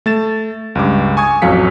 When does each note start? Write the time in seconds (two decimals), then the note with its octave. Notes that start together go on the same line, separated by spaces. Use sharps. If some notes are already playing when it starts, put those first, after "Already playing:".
0.06 A3 A6 E7
0.75 C#2 G2 D6
1.17 G#5 C#6 D#6 G#6
1.42 A1 F2 F#3 F5 B6 C#7